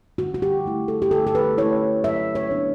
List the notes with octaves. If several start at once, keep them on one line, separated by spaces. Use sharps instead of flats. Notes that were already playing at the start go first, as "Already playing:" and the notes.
D3 F#4
F#4
G4
A3 E4
A4
G4
D3 A4
A4
B4
A3 E4 C#5
F#3 E5
C#5
B3 D4